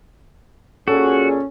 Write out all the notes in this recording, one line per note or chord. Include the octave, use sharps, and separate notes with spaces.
A#2 C#4 F#4 G#4 A4